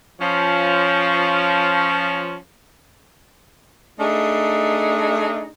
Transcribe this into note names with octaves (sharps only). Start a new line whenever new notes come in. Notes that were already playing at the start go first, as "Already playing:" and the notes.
F3 C#4
A3 D4 D#4 G#4 D#5